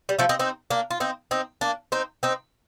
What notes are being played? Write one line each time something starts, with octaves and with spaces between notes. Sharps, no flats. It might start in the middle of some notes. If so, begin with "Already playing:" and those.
G3
F3 A3
C4 D#4
C4 D#4
A#3 D4
F4
C4 D#4
C4 D#4
A#3 D4
C4 D#4
C4 D#4